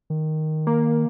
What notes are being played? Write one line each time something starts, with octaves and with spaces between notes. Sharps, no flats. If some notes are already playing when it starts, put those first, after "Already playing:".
D#3
A#3